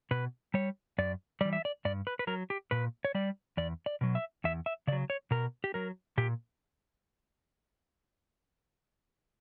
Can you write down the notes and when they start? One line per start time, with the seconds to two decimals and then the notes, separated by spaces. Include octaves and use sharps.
0.11 B2 B4
0.54 G3 C#5
0.98 F#2 D5
1.41 E3 G3 D5
1.53 E5
1.65 D5
1.85 G2 D5
2.07 B4
2.19 B4
2.27 F#3 A#4
2.50 G4
2.71 A#2 B4
3.05 C#5
3.15 G3 D5
3.57 E2 D5
3.86 D5
4.01 B2 F#3
4.15 E5
4.44 E2 E5
4.66 E5
4.87 C#3 D5
4.92 F#3
5.10 C#5
5.31 B2 A#4
5.64 G4
5.74 F#3 A#4
6.18 A#2 G4